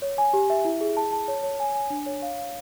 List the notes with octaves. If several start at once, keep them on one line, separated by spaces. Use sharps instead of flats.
C#5
G#5
G4
E5
E4
G#4
A5
A5
C#5
C#5
G#5
G#5
D4
C#5
F5
F5